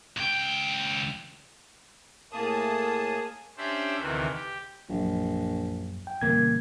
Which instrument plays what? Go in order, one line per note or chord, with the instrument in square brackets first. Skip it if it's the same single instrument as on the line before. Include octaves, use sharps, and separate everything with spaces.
[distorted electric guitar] C#2 G5
[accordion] A2 A5 D#6 [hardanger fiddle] A#3 G#4
[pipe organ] C#4 D4 G4 C5 D5 E5
D2 C3 D#3 E3
G4
[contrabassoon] A#1 [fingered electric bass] F#2 F#3
[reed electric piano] G5
[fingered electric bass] A#2 E3 G3 [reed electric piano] C#3 A#3 G#6